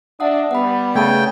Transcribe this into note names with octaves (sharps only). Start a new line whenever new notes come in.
D4 E5 F#5 D#6
G3 B3 F#5 B5
C#3 A3 G5 A5 G#6